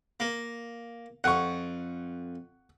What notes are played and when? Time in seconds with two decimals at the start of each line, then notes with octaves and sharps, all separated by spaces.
0.20 A#3
1.24 F2 F#5 C#6